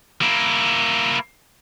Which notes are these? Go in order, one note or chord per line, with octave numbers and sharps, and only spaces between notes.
A#3 E4